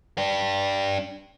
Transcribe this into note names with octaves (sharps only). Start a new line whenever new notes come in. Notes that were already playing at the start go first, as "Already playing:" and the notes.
D4 G4